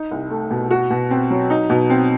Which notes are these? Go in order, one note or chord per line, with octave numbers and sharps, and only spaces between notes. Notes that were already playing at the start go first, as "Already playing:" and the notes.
Already playing: D#4
C2
A3
B2
F#4
B2
C4
F#3
D#4
B2
C4